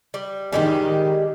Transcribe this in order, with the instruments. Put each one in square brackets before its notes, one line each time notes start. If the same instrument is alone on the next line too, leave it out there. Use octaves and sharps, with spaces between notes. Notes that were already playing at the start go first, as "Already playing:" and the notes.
[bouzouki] G3
[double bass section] D#3 [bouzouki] G3 G#3 G4